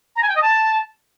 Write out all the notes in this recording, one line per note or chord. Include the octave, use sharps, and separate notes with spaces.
A#5
G#5
G5
D#5
A5